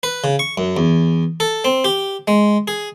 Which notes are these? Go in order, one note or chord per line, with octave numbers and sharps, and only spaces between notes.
B4
C#3
C#6
F#2
E2
A4
C4
G4
G#3
G#4